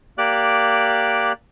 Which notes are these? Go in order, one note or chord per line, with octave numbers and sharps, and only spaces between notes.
A#3 G4 D5 D6 F#6